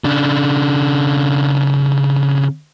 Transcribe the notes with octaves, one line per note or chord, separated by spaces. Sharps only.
C#3 D4